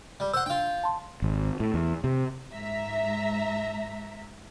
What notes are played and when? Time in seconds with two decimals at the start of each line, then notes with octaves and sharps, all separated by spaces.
0.20 G3
0.34 C5 F#5 E6
0.46 D4 F4 G5
0.83 A5 C6
1.22 G#1
1.60 A2
1.74 E2
2.04 C3
2.53 G#2 E5 A#5